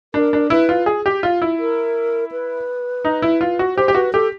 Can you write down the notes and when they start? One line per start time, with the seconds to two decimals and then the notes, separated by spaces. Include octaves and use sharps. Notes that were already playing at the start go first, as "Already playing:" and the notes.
0.14 D4 A#4
0.33 D4
0.50 E4 B4
0.69 F4
0.86 G#4
1.06 G4
1.23 F4
1.42 E4
1.59 A#4
2.32 B4
3.05 D#4
3.22 E4
3.41 F4
3.59 F#4
3.76 G4 C5
3.88 G4
3.95 F#4 B4
4.13 G4 A4